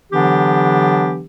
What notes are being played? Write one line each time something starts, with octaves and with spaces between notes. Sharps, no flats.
D3 E3 F#3 B3 D4 G4